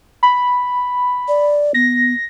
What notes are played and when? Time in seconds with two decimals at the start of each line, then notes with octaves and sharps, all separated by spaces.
0.23 B5
1.28 D5
1.74 B3 A#6